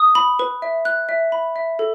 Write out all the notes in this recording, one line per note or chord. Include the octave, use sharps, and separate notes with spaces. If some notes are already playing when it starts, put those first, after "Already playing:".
Already playing: D#6
B5
B4
E5
F#6
E5
B5
E5
A4